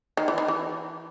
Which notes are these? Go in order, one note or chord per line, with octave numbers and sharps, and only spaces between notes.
D#3
E3
D#3
E3